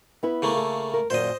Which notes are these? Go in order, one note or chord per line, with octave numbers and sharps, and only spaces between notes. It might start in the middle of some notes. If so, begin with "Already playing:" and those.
B3 E4 B4
C#3 A3 A#3
A4
A#4
F#2 A#2 D#3 C5 D#5